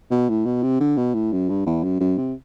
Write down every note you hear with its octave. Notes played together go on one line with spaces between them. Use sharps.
B2
A2
B2
C3
D3
B2
A2
F#2
G2
E2
F#2
F#2
C3